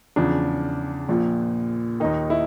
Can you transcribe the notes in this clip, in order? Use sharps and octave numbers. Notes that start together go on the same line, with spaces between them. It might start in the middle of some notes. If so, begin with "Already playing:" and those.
E2 C#3 F3 D4
A#1 A#2 F3
D#2 D#3 D#4
E4